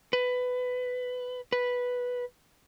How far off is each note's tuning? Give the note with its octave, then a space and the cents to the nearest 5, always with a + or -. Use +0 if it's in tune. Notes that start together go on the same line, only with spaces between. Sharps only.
B4 +15
B4 -5